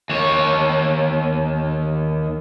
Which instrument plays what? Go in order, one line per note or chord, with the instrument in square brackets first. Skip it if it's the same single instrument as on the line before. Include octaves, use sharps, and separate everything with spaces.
[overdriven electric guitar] D#2 C#5